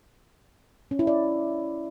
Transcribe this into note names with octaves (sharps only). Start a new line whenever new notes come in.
C#4
E4
D5